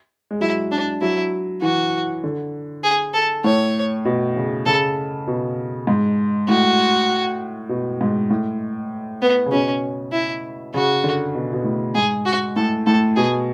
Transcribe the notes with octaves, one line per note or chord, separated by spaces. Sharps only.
G#3
F#3 E4
D4
F#3 E4
E3 F#4
D3
G#4
A4
A2 C#5
B2
C#3
C#3 A4
B2
G#2
A2 F#4
B2
G#2
A2
B3
C#3
B2 C#4
E4
C#3 F#4
D3
B2
B2
A2
G#2 G#4
F#4
A2 A4
A2 A4
B2 G#4